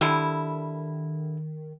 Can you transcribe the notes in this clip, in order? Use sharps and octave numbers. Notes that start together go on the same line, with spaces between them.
D3 D#3 G3 E4